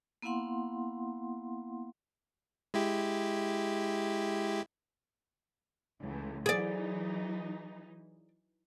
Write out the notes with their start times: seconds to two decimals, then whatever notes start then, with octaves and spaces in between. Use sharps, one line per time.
0.22 A#3 B3 E4 F5 F#5 C6
2.74 G#3 E4 G4
6.01 C#2 E3 A3
6.46 E3 F#3 D#4 G#4 D5